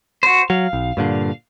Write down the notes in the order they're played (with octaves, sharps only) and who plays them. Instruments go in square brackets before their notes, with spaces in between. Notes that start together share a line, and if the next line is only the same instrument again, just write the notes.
[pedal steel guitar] F#4 C5
[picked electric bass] F#3 [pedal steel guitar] F5
[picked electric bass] B1
G2 A#2 D3